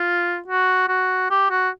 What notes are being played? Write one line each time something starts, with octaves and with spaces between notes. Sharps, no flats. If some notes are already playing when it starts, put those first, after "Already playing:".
Already playing: F4
F#4
F#4
G4
F#4